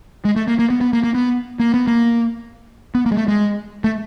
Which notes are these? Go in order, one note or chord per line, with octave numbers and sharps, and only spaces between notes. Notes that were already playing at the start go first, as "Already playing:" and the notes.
G#3
A3
A#3
A#3
B3
B3
A#3
A#3
B3
A#3
B3
A#3
B3
A#3
G#3
A3
G#3
A3